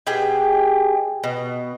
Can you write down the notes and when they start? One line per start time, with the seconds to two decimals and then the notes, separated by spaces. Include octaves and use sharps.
0.07 B2 G4 G#4 G5
1.24 B2